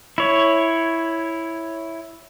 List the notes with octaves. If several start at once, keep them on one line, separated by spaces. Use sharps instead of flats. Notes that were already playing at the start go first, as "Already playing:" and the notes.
E4 C#5